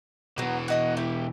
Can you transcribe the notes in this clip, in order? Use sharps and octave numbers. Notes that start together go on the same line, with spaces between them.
B2 E3 F#3 B3
F#4 D#5 F#5
E4 G4